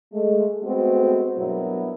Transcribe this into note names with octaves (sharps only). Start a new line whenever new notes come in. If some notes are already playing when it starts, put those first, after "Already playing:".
G#3 A3
G#3 A3 B3 C4 F#4
G2 B2 F#3 B3 E4 A#4